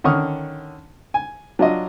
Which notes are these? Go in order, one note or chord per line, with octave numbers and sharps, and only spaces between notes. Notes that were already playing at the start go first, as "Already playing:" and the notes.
D3 D#3 C#4 C#6 D#6 F6
G#5
F#3 D4 F4 D#5